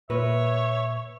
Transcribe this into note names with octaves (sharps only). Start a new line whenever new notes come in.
A#2 B4 C#5 E5